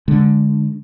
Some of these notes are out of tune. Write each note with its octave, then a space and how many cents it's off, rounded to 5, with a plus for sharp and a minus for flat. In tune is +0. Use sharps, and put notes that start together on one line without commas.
D3 +0 G#3 +0